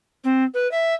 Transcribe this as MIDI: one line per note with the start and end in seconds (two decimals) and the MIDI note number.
0.24 0.43 60
0.54 0.70 71
0.71 0.94 76